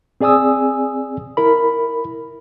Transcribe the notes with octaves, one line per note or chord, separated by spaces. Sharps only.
C4 G#4 D5 G#5 D#6 E6
E4 A#4 B5